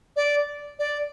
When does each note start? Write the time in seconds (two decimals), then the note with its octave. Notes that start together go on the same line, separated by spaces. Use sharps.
0.16 D5
0.79 D5